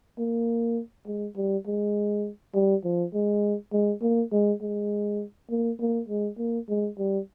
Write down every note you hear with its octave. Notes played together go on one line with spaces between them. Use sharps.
A#3
G#3
G3
G#3
G3
F3
G#3
G#3
A#3
G#3
G#3
A#3
A#3
G#3
A#3
G#3
G3